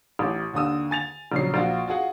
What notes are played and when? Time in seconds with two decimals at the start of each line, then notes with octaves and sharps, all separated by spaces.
0.19 A1 D6
0.54 D#2 D3 D#6 E6
0.91 G#5 A6 F7
1.32 A#1 C#3 F#3 C7
1.54 A#1 F4 F#4
1.88 F4 F#4 G#4 F#5